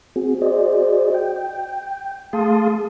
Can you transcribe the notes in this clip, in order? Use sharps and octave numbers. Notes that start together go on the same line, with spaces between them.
C4 F#4 G#4
F#4 G#4 C5 D5 D#5
G5
A3 G#4 F5 A5 C6 D#6